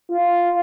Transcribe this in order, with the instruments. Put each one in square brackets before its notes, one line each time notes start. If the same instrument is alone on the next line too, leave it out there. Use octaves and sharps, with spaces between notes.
[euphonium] F4